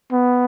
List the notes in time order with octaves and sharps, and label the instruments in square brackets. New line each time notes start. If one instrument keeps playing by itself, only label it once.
[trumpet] B3